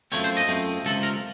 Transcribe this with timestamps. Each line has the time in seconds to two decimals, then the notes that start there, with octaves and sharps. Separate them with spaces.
0.12 F#2 F3 A3 C4 C#5
0.24 C5
0.37 D#5
0.48 F#2 F3 A3 C4
0.85 C#2 C3 F3 A4
1.03 A#4